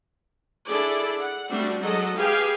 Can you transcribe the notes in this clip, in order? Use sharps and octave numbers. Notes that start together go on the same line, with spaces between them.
D4 E4 G#4 A4 D5
F#5
G3 A3 C4 D4 F#4
F#3 G#3 A4 D#5 F#5
G4 G#4 B4 F5 G5 G#5